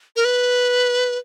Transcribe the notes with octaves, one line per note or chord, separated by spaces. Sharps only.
A#4
B4